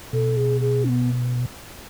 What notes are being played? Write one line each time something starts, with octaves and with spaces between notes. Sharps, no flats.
B2 A4
G#4
G#4
C#4
B3